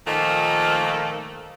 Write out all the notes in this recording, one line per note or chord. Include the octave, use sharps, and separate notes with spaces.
A#2 D#3 F3 A3 A#3